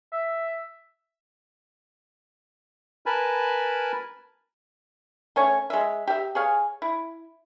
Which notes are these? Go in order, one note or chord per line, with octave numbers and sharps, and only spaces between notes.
E5
A#4 B4 G#5 A5 B5
A3 C#4 C#5
G#3 E5
G4 E5
G#4 C#5 F5 G#5
E4